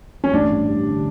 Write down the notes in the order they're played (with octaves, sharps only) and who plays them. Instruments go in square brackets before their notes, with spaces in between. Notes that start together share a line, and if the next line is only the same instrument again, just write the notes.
[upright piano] C#4
[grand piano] A1 [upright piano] D4
[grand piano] G2
G3
D3